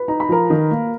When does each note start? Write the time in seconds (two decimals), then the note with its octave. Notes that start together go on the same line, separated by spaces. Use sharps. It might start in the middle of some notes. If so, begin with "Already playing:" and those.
Already playing: B4 B5
0.08 D#4 A#5
0.20 B5
0.29 F3 A#4 A#5
0.50 D#3
0.71 A#3